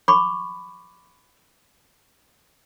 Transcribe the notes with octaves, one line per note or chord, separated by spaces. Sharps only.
B5 C#6 D6